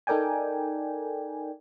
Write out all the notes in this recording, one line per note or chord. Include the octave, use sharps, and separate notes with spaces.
D#4 A4 A#4 D5 G5 G#5